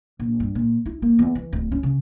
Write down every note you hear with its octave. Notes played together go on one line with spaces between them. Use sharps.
A#1
G2
A#2
E4
A#3
E2
E3
D1
C#4
C#3